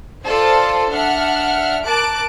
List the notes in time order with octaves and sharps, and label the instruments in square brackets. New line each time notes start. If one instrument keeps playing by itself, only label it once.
[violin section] F4 A4 C5 D5 A5
D4 E5 F#5 F6
A#4 A5 D6 F#6 D7